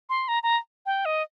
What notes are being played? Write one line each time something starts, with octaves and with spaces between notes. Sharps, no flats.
C6
A#5
A#5
G5
D#5